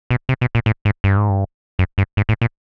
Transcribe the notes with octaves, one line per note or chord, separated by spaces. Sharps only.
B2
C3
B2
A#2
A2
G#2
G2
G#2
G2
F#2
G2
G#2
A2
A#2